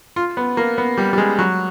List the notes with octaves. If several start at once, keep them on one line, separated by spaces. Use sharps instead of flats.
F4
B3
A#3
B3
G3
G3
G#3
F#3